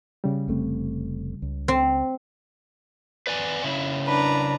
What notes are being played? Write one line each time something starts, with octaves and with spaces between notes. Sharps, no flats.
C#3 G3
F1 A3 C4
C#2
C4
B4 D5 G#5
C#3 E4
D4 B4 A#5